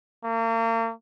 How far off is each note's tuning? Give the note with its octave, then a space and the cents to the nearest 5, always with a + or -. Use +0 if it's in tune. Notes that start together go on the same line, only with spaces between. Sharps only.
A#3 -40